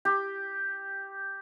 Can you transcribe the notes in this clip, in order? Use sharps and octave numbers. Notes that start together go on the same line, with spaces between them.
G4